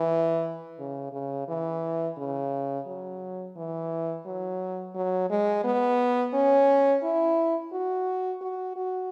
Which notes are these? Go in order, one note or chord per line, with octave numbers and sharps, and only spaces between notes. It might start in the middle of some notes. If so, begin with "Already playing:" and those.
Already playing: E3
C#3
C#3
E3
C#3
F#3
E3
F#3
F#3
G#3
B3
C#4
E4
F#4
F#4
F#4